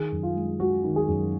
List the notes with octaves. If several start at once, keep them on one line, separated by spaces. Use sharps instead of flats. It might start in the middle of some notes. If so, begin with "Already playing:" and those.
Already playing: D#3 G#4
F#2
F4
G#3
G#3 F#4
D#3
G#4
F#2